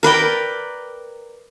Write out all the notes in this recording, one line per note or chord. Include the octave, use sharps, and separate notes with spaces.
A#4 B4 D5 G5